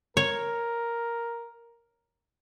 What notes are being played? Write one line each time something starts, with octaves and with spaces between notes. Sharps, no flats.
A#4 C#5